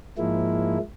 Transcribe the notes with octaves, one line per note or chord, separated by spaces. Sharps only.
G#2 F3 G#3 A#3 E4